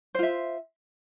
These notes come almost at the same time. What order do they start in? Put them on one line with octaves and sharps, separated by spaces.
C5 F4 E5